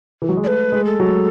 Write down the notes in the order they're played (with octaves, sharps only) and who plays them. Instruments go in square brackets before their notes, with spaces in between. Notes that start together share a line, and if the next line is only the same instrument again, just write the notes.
[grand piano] E3
F#3
G#3
[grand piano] A3 [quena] B4 D5
[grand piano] G#3
[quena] A4
[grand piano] F#3